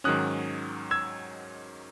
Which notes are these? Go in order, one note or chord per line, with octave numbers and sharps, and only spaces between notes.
G#2 D#3 F#3 C#4 D#6 F#6
E6 G#6